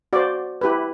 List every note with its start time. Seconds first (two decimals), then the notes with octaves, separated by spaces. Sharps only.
0.13 F#4 C5 D5
0.61 E4 G4 B4